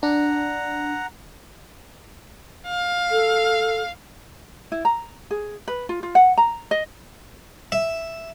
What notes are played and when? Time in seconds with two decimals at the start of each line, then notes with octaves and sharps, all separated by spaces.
0.03 D4 F#5 A#5
2.67 F5
3.11 A4
4.72 E4
4.85 A#5
5.31 G#4
5.68 B4
5.89 F4
6.03 F4
6.15 F#5
6.38 A#5
6.71 D#5
7.72 E5